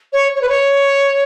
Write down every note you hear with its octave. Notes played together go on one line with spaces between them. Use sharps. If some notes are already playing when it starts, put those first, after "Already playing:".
C#5
C#5
B4
C#5